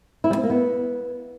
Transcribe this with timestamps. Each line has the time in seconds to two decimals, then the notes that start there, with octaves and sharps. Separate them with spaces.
0.24 E4
0.31 G3
0.37 C4
0.43 A#3
0.50 B3